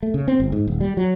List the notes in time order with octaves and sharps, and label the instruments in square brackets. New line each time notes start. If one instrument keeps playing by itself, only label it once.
[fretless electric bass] A3
C#3
C4
G1
G#2
D#1
G3
F#3